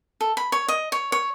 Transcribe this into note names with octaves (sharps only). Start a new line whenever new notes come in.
A4
B5
C#5
D#5
C#5
C#5